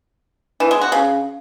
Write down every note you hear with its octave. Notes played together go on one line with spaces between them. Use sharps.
E3
G#3
F#4
C#3